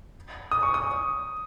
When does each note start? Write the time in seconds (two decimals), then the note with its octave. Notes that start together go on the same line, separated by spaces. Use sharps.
0.51 D#6
0.63 C#6
0.74 D#6